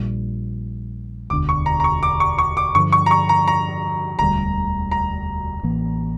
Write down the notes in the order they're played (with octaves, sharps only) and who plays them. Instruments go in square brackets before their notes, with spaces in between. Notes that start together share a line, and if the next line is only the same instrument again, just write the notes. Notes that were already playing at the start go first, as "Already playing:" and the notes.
Already playing: [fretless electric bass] A#1 A#2 G3
[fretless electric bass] E1 D2 D3 [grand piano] D6
[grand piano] C#6
A#5
A#5
C#6
D6
C#6
C#6
D6
[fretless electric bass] G2 D3 F3 [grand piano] C#6
[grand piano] C#6
A#5
C#6
A#5
A#5
[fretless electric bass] E1 D2 D3 G3 [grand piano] A#5
[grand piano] A#5
[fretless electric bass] A1 A2 E3 A#3